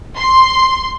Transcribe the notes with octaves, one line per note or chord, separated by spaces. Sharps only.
C6